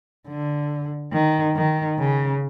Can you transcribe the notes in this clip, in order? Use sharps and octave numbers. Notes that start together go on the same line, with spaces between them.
D3
D#3
D#3
C#3